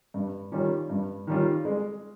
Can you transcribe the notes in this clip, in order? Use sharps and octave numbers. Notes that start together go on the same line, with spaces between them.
G2
D#3 G3 C#4 F4
G2
D#3 G3 C#4 F4
G#3